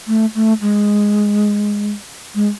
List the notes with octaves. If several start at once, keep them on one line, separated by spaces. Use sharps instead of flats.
A3
A3
G#3
G#3